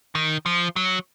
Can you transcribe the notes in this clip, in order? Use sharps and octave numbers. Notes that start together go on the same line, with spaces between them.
D#3
F3
F#3